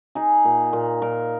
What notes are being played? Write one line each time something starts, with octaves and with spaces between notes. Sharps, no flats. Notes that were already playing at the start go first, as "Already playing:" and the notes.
D#4 G#4
A#2
A#2
A#2 A#4